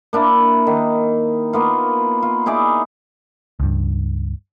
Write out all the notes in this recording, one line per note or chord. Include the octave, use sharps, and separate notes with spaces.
A#3 D4 E4
D#3
A#3 B3 F4
F4
D#4 E4 G#4 D5
C#2 G2